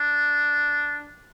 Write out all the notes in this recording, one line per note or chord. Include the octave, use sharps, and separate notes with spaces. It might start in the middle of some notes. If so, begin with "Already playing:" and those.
Already playing: D4